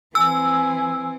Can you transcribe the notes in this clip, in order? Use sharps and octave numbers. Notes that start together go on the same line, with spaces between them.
E3 C4 G#5 E6